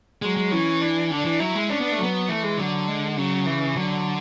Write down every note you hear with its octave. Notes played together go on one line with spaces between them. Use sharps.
F#3 G#3
G#3
E3 C#4
D4
D3 D4
E3
F#3 E4
G#3
C#4 D4
B3
A3
F#3 B3
E3 A3
G#3
D3 F#3
G#3
C#3 F#3
E3
D3 F#3